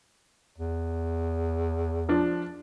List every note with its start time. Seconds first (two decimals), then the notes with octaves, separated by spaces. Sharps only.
0.58 E2
2.09 F3 D4